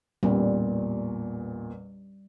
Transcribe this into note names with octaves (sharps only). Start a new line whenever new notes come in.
A1 E2 A#2 G3